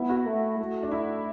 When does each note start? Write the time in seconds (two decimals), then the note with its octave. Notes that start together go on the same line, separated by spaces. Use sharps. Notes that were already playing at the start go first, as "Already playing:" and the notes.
Already playing: B3 E4
0.09 F#4
0.26 A3
0.59 A3
0.83 D4
0.91 E4